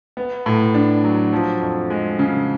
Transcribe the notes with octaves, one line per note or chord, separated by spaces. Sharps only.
B3
A2
D4
F#3
F3
F2
G#3
C#3